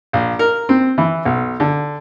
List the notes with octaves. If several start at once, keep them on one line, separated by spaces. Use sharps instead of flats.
A#1
A#4
C4
E3
B1
D3